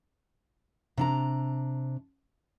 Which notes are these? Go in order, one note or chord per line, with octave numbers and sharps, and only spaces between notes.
C3 D4 A#5